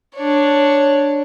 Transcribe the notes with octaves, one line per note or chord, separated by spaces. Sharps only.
D4 C#5